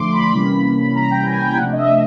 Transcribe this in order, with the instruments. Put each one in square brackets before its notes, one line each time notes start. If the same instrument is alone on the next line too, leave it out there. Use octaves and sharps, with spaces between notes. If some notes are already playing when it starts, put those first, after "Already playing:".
Already playing: [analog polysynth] D3 F3 A3 D4 C6 D6
B5
C6
C3 E3 G3 A#3 C#4 B5
B5
A#5
G5
G#5
G5
C3 F3 A3 D4 F#5
D#5
E5